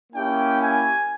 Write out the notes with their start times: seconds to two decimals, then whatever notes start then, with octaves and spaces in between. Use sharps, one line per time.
0.13 A#3 C#4 E4 G4 G5
0.60 G#5